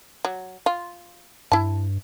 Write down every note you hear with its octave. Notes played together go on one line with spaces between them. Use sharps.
F#3
F4
G2 E4 A5